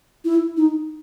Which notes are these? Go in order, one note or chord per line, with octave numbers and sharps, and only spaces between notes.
E4
D#4